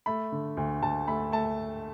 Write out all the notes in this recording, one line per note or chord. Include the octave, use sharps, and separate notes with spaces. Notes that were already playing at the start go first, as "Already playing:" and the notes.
A3 B5
D3
D2
D2 A5
A3 B5
A3 A5